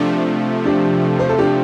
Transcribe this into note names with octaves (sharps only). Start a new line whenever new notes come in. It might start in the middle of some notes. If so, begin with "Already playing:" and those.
Already playing: C3 F3 A3 D4
D4 G4
C5
A4
D4 G4